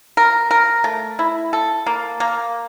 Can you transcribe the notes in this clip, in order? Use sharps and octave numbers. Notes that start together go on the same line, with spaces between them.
A#4
A#4
A3
E4
A4
A#3
A#3